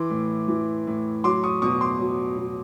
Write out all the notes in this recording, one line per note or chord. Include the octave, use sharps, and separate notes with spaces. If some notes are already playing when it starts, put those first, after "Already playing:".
Already playing: E3 C6 D6
A2
E3
A2
F#3 C6 D6
C#6 D#6
B2 C#6 D#6
C6 D6
F#3
B2